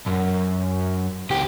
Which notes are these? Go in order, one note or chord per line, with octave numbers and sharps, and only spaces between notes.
F#2
C#2 G4